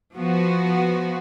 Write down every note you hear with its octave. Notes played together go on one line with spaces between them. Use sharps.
F3 B3 F#4